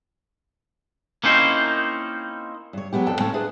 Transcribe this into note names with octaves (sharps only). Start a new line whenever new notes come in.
A#3 C4 C#4 D#4 E4 C5
G2 C#5
F#3 G#3 B3 G4
F2 A#3 D4 A4 G5
A2 A#3 C4 C#5 G5 A5
D4 E4 G#4 B4